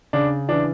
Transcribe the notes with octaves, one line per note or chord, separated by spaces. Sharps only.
C#3 D4
E3 D4